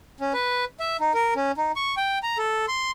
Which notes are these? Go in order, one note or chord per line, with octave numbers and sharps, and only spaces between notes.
C#4
B4
E5
D#4
A#4
C#4
D#4
C#6
G5
A#5
A4
C6